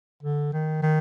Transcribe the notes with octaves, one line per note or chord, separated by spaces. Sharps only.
D3
D#3
D#3